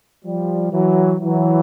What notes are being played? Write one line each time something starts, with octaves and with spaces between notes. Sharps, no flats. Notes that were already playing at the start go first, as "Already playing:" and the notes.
F3 G3
E3 F#3
E3 F#3